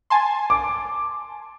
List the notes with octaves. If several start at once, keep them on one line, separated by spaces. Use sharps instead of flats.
G#5 A5 C6
D6